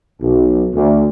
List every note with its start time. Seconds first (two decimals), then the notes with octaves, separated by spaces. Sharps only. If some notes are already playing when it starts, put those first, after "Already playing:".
0.22 B1
0.74 D2